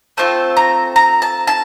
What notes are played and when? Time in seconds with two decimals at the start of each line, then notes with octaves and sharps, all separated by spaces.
0.17 A3 C4 F4 A4 A5
0.57 A#5
0.96 A#5
1.22 A5
1.47 A5